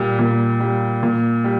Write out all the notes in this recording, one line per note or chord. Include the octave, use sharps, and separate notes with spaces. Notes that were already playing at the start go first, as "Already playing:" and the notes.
Already playing: A#2 G3
A#2
G3
A#2
G3